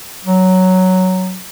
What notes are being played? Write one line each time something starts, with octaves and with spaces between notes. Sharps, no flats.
F#3